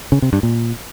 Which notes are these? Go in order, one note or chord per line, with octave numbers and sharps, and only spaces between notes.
C#3
C3
G2
A#2